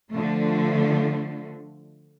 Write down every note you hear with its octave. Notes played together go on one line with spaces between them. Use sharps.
D3 F3 A3